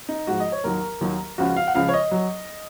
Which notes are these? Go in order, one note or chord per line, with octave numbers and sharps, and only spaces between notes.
D#4
G#2 F3 F#4
D#5
C#5
D#2 D#3 F#3 A#4
D#2 D#3 F#3
C#2 C#3 F3 F#4
F5
F#5
C#2 C#3 F3 F5
C#5
D#5
F#3